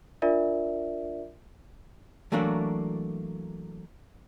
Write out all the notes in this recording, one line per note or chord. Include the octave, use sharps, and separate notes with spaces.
D4 F4 A#4 D5 E5
E3 F#3 A3 A#3 D4 F#4